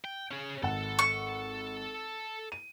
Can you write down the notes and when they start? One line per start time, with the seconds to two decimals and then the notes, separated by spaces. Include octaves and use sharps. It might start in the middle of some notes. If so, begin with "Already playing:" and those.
0.05 G5
0.31 C#4 G#4
0.63 G#1 A4 F#5
0.99 C#6
2.52 D#7